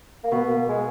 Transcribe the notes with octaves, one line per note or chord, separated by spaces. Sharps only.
A#3
B2 B3
A#3
G#3